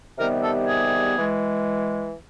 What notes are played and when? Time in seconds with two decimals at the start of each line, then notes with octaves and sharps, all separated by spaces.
0.18 C3 D#3 G3 B3 A#4
0.42 A4
0.66 G#4
1.17 E3 G#3